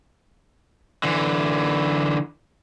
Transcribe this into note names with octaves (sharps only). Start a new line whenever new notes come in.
D3 E3